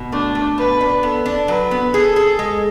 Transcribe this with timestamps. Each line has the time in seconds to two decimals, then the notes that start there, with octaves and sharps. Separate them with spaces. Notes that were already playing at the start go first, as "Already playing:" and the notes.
Already playing: B2
0.12 A3 D4
0.35 A3
0.58 B2 B4
0.81 D4
1.03 B3 A4
1.26 D4
1.48 F#3 B4
1.71 B3
1.93 G#4 A4
2.16 G#4
2.39 G#3